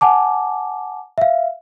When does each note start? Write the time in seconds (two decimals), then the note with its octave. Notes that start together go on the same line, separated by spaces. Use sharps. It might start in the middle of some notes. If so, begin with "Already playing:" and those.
0.01 F#5 G#5 A5 D6
1.18 E5 F5